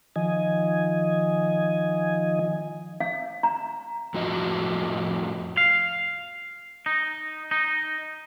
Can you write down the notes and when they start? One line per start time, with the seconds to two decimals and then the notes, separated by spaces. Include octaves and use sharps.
0.16 D#3 F3 D#5 G#5
3.00 F5
3.43 A#5
4.14 F2 A2 F4 F#4 D#5
5.57 F5
6.86 D#4
7.51 D#4